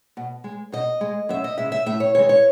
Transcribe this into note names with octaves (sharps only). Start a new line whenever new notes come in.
B2
G#3
B2 D#5
G#3
F#2 E5
D#5
C#3 G#3 E5
E5
A2 E5
C#5
E3 G#3 C#5
C#5